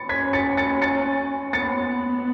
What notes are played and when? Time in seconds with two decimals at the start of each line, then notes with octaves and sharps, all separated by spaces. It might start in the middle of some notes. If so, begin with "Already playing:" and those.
Already playing: A6 C#7
0.09 C#4 G#6 B6
0.33 A6 C#7
0.57 A6 C#7
0.81 A6 C#7
1.53 B3 A6 C#7